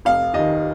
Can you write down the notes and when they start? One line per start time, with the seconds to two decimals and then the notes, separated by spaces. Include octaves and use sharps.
0.05 F1 F5
0.33 D#2 D#5
0.38 D#3